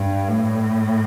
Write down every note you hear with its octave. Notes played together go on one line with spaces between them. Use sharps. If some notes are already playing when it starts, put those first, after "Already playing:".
Already playing: G2
A2